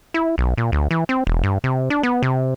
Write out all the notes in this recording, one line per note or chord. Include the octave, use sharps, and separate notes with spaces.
E4
B1
A#2
D2
E3
C4
E1
G2
C3
D4
B3
C3